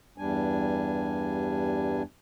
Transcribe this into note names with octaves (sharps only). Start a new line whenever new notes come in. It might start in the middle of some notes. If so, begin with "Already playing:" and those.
E2 G2 G3 D4 G#5